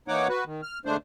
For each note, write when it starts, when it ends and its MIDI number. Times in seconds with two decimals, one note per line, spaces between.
0.08 0.28 52
0.08 0.28 58
0.08 0.28 63
0.08 0.28 73
0.08 0.28 78
0.08 0.28 86
0.29 0.44 66
0.29 0.44 71
0.46 0.61 51
0.63 0.79 89
0.85 0.97 50
0.85 0.97 56
0.85 0.97 57
0.85 0.97 62
0.85 0.97 72